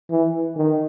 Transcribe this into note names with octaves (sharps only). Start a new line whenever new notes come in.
E3
D#3